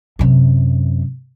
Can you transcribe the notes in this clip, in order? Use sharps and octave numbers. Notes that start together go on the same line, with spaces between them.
F#2 C3